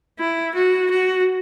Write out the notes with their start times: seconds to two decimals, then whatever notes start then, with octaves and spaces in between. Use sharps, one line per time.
0.19 E4
0.54 F#4
0.90 F#4